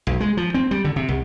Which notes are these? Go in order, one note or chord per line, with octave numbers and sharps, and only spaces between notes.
B1
G#3
F3
C4
G3
D3
C3
C2